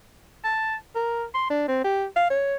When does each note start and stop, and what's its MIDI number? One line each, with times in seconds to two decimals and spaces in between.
0.44 0.75 81
0.95 1.25 70
1.35 1.48 84
1.50 1.67 62
1.68 1.83 60
1.85 2.06 67
2.16 2.29 77
2.30 2.57 73